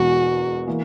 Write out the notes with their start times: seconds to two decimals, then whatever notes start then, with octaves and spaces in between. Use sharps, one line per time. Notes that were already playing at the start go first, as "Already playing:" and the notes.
Already playing: E1 E2 B2 G#3 F#4
0.67 E3 A#3